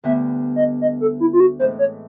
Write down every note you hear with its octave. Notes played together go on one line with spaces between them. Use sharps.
D2 D3 G3 B3 E5
D#5
D#5
A4
E4
F4
F#4
A2 E3 G#3 C4 C5
C#5